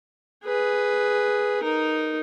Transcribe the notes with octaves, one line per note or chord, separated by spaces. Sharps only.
G#4 B4
D#4 A#4